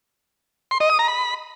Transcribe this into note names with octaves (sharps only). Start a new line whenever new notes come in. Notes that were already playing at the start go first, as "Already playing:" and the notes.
C6
D#5
D#6
A#5
B5